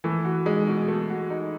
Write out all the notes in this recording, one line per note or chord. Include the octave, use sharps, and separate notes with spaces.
E3 A3
F#4
G#3 D#4
B2
A3
F#4
D#4